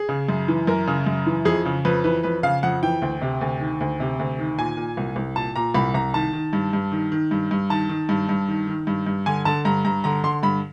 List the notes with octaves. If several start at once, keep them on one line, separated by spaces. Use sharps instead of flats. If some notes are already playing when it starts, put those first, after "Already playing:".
Already playing: G#4
C#3
F#2
E3
F#2 A#4
C#3
F#2
E3
F2 G#4
C#3
F2 B4
E3 B4
F2 B4
C#3 F5
F2 F#5
E3 G5
D2
C3
D2
D#3
D2
C3
D2
D#3
A#2 G#5
A#2
C2
C2
A#2 A5
A#2 A#5
C2 B5
C2 A#5
D#3 A5
D#3
G2
G2
D#3
D#3
G2
G2
D#3 A5
D#3
G2
G2
D#3
D#3
G2
G2
D3 G#5
D3 A5
G2 A#5
G2 A#5
D3 A#5
D3 C6
G2 B5